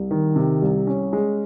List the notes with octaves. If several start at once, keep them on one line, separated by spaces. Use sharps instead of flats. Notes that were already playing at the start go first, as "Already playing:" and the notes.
Already playing: C2
D#3
C3
C2
C#4
G#3